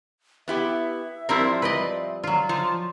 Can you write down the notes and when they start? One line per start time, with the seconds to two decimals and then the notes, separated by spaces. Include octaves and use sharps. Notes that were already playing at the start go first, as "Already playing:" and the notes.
0.48 B3 E4 G4 E5
1.29 F3 G3 C4 E4 A#4
1.62 B4 D5 D#5
2.23 F#3 F4
2.49 F3